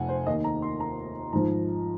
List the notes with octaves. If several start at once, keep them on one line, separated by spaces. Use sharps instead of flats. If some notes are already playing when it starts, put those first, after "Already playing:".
Already playing: F1 F2 F#5 G#5
C5
D#2 D#3 D#5
A#5
C6
A#5
G#1 G#2 F3 A#5